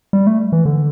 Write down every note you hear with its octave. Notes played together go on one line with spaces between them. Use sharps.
G3
A3
E3
D3